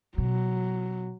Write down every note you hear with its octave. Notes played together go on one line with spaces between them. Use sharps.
B2 F#3